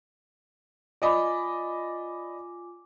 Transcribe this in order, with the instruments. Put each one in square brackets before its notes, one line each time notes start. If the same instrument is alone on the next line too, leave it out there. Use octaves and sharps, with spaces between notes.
[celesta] F4 G#5 D6 [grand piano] D5 D#5 B5